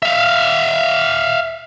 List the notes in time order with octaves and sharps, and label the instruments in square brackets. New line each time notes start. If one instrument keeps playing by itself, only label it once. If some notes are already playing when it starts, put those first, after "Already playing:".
[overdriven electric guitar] E5 F5